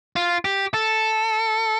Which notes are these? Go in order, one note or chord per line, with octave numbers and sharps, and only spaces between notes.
F4
G4
A4